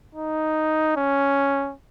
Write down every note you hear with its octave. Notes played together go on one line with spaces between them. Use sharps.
D#4
C#4